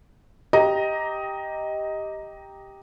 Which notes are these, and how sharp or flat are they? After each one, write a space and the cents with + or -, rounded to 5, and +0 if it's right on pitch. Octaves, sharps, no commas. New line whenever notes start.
G4 +0 D#5 +10 A#5 +0